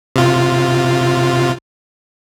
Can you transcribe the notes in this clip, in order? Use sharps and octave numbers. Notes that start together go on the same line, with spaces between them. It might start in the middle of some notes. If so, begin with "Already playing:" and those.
C3 F4